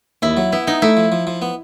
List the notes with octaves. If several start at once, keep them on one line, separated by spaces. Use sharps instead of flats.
D#2 E4
F#3
B3 E4
B3 D#4
A3 E4
F3
F3
F3
B3